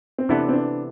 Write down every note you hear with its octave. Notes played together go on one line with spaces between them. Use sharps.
C4
C3 E3 B3 D4 E4 A4
C4
D4